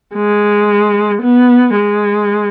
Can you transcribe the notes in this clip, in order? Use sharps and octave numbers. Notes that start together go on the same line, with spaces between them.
G#3
B3
G#3